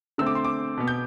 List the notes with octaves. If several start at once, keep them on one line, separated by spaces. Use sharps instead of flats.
D3 A3 C4 E6
D6
C6
D6
B2 B3
G6